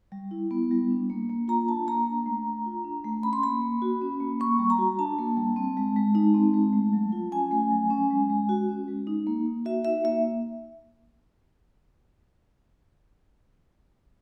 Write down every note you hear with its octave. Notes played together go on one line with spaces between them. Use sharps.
G3
E4
B3
G3
D4
A#3
A#3
F4 A#5
D4 A5
A#3 A#5
D4
A3
A3
F4
D4
A3
C#4 B5
C6
A#3 B5
A#3
F#4
C#4
A#3
A#3 C#6
G3
A#5
F#4
D4 A5
A#3
G3
C4
G#3
G#3
D#4
C4
G#3
A3
F#3
F4
C#4 G#5
A3
F#3
C#4
G#3
G#3
F#4
C#4
G#3
D#4
A#3
A#3
F#4 E5
D#4 E5
A#3 E5